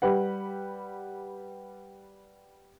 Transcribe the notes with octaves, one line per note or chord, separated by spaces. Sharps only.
G3 G4 B4 F#5